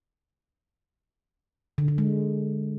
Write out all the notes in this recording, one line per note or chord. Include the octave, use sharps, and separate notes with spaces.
D3
D3
G#3